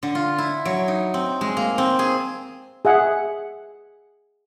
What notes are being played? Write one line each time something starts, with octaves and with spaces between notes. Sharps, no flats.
D3
F4
E4
F#3
D#4
C4
G#3
A#3
C4
G#4
G#4 E5 F#5